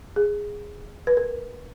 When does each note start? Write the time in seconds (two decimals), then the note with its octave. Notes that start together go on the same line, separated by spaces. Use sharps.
0.16 G#4
1.07 B4
1.17 A#4